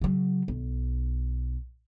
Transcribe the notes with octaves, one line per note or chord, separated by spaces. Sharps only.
C#3 F#3
B1